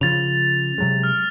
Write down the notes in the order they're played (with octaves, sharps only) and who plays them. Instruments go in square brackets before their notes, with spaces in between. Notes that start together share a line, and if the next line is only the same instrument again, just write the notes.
[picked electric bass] C#3 F3 [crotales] A6 F7
[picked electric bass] C3 F#3 G#3
[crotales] F6